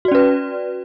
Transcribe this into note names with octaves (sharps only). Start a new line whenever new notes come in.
C#4 F#4 B4 D5